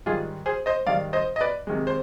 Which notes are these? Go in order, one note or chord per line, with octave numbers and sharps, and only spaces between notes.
G#2 D#3 G3 F4 G#4
G#4 C5
C5 D#5
G#2 D#3 G3 D5 F5
C5 D#5
D#5
B4 D5
C3 D#3 G#3
C5